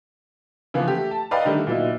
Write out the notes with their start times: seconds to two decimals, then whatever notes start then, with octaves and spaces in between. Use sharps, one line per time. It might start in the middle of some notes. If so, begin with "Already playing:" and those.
0.74 C#3 E3 F3 A#3 B3
0.88 A3 G4
1.11 A5
1.31 B4 D5 D#5 F5 G5 A#5
1.45 D3 D#3 G3 A3
1.67 A#2 F#3 B3 D#4 E4